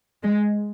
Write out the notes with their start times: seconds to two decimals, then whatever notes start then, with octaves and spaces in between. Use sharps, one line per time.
0.23 G#3